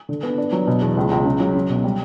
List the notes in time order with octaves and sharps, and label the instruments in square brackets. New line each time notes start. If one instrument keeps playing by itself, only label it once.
[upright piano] D3
B3
D4
F#3
B2
E2
C#2
C#2
C#3
F#3
C#4
B2
G3